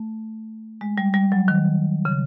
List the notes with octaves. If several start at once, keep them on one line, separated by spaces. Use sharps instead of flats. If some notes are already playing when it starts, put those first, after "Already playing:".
Already playing: A3
G#3
G3
G3
F#3
D#3
C#3